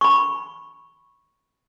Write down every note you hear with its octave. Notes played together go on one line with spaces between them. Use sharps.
B5 C#6